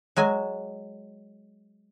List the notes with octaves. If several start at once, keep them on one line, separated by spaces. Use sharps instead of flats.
F#3 G#3 G#5